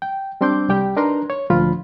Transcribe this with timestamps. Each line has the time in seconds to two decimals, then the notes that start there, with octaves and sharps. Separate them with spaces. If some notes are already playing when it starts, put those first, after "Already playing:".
0.02 G5
0.41 G3 C4 D4 C6 D6 G6
0.69 C2 G3 G4 G5
0.96 D4 D#4 A#4 B4 A#5 C6
1.30 C#5
1.50 D2 A#2 F3 F4 B5